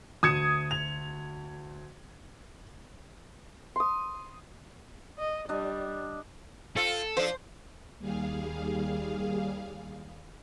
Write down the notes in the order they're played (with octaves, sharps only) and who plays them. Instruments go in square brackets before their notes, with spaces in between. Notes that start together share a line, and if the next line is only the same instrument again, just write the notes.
[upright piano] D2 E7 [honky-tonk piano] D#6 G#6 C#7
[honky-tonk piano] F7
[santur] C6 D#6
[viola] D#5
[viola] G3 [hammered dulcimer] D4 D#5
[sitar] C4 F4 [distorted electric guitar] A4
[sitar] F3 D4 [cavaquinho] C5
[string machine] D#2 G3 G#4 F5